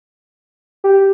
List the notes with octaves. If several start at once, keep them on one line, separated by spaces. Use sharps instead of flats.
G4